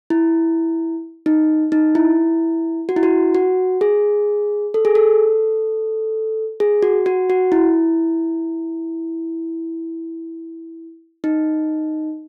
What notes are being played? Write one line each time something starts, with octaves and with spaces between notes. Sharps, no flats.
E4
D#4
D#4
E4
F#4
E4
F#4
F#4
G#4
A4
G#4
A4
G#4
F#4
F#4
F#4
E4
D#4